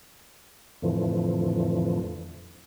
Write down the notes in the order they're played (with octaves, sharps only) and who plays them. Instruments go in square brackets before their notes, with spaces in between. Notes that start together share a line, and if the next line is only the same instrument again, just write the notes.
[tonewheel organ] F2 A2 D3 E3 F3